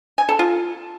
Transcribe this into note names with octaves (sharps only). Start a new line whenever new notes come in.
G#5
A4
F4